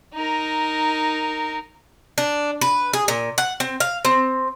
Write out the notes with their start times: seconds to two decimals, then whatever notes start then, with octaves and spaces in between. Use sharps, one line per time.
0.14 D#4 A#4
2.18 D4
2.61 B4
2.93 G#4
3.08 A#2
3.38 F#5
3.60 C4
3.80 F5
4.05 C4